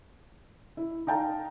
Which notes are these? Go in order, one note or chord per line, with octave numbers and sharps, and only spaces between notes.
E4
D#4 F5 G5 A5 A#5